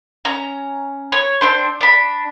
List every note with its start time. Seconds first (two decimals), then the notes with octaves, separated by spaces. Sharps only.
0.25 C#4 A#5
1.12 C#5
1.41 C4 D4 C5
1.81 D4 B5